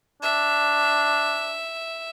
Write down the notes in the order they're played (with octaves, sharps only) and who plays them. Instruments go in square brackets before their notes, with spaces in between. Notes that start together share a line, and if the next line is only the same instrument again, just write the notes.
[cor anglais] D4 [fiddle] E5